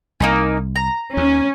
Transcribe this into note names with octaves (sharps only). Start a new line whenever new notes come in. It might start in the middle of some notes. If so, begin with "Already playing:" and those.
C2 A#3 D#4 G#5
A#5
D#2 C#4